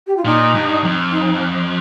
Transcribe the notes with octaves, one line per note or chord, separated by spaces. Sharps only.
G4
F4
A#2 D#4
G2
F2
D#4